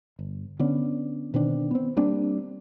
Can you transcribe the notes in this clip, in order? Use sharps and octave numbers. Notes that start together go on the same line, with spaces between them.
G1
D3 B3 C#4 D4
B2 D#3 C4 D4
B3 C4
G3 A#3 C4 D4